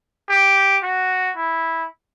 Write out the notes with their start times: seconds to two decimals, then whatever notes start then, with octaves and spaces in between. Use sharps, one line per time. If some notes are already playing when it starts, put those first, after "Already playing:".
0.29 G4
0.83 F#4
1.37 E4